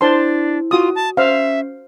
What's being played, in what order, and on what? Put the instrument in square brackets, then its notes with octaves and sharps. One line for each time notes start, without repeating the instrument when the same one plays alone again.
[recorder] D4 [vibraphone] E4 [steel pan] C5 A5 C6
[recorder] F4 [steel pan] F#4 D#6
[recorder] A5
[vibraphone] C#4 [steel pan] C5 F5 [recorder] E5